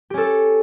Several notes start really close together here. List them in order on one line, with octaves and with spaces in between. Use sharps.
G4 C#4 A4